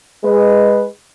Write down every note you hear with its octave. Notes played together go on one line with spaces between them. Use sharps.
G#3 B4